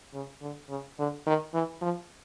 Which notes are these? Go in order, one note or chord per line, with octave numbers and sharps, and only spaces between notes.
C#3
D3
C#3
D3
D#3
E3
F3